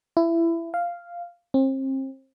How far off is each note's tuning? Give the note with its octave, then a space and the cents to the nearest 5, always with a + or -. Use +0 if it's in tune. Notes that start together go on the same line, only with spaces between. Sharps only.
E4 +20
F5 -5
C4 +35